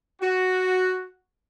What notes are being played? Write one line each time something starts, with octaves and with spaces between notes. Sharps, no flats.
F#4